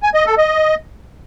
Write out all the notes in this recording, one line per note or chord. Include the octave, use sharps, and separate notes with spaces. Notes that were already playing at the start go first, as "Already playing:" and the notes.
G#5
D#5
A4
D#5